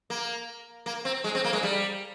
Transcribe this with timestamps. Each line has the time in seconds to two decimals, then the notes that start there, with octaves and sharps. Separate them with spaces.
0.10 A#3
0.86 A#3
1.05 C4
1.24 G#3
1.35 C4
1.44 A#3
1.53 G#3
1.63 G3